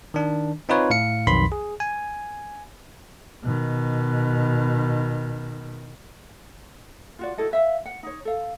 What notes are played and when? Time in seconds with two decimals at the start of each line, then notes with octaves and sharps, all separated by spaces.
0.14 D#3 D4
0.69 C4 D#4 F4 B4 C#5
0.90 A2 F5 C#7
1.27 B1 F2 D#3 B5 C6 B6
1.52 G#4
1.80 G#5
3.43 B2 D#3
7.19 F4 F#4 D5
7.38 E4 F#4 A4 D#5
7.51 B4 E5 F5
7.85 F#5
8.03 D#4 C#5
8.25 A4 F5